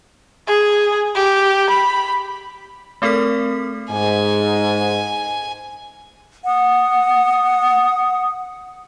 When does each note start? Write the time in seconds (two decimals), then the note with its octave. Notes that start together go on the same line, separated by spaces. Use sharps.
0.48 G#4
1.16 G4
1.70 B5
3.02 A3 C4 A4 A#4 F6 B6
3.91 G#2 G#5
6.45 F#5 D#6